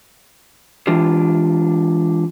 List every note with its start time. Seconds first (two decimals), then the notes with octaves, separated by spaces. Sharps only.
0.87 E3 G#3 D4 F4 G4